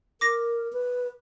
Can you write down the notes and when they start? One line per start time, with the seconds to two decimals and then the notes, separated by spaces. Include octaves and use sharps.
0.21 A#4 D6 A#6
0.73 B4